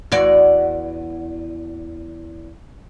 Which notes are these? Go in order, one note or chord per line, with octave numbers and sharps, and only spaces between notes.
E2 F#4 D5